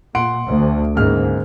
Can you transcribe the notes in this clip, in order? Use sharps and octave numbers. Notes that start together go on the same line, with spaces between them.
A#2 F#5 C6 D7
D2
C#2 G#2 A#3 F6